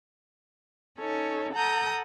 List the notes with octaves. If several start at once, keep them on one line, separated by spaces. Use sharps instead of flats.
C#4 D#4 A4 C#5
A4 F#5 A5 A#5 D#6 G6